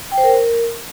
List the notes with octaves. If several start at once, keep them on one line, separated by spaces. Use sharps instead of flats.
G5
C5
A#4